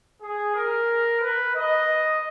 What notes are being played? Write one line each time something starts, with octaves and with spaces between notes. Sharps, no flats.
G#4
A#4
B4
D#5